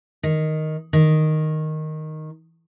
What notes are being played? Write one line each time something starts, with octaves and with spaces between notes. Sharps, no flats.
D#3
D#3